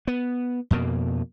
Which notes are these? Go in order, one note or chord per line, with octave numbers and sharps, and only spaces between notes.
B3
F2 B2 A#3